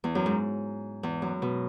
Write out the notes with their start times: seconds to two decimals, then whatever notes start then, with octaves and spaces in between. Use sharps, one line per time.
0.04 E2
0.15 F#2
0.26 G#2
1.03 E2
1.22 F#2
1.42 B2